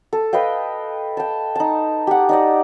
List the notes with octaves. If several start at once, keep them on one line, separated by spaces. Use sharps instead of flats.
A4
B4 D#5 F5 G5
G5 A5
D#4 A5
G4 F#5
D#4 D5 D#5